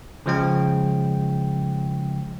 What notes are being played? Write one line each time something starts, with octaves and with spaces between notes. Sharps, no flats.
C#3 F3 G#3 G5